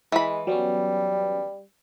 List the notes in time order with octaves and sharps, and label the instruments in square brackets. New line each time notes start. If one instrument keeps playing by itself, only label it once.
[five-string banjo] E3 B5 [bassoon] G#3
[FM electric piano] F#3 B3 C#4 [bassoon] G3